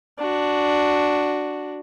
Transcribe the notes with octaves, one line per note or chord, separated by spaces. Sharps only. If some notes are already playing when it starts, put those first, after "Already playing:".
D4 F#4